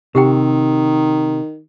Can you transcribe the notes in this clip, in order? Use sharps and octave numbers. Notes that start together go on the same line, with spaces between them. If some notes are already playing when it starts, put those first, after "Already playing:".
C3 D#3 G4 F#5 G5